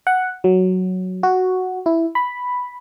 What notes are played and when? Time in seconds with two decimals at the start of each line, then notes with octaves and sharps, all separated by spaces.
0.07 F#5
0.44 F#3
1.23 F#4
1.86 E4
2.15 B5